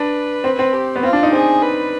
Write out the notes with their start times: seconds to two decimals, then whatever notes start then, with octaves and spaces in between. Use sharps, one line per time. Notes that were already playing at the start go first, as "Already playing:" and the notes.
Already playing: D4 B4
0.44 C4
0.59 C4
0.73 G4
0.96 B3
1.03 C4 F4
1.13 D4
1.23 D#4
1.33 C4 G#4
1.63 B4